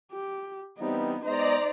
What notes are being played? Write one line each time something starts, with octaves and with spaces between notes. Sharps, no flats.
G4
E3 G3 B3 C4 D#4
G#3 B3 D#4 C5 D5 D#5 A#5